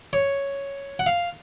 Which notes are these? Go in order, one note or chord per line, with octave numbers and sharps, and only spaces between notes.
C#5
F#5
F5